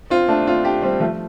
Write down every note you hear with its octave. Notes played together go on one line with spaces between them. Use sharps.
C4 F4
A3 D4
C4 F4
D4 G4
G3 C4
F3 A3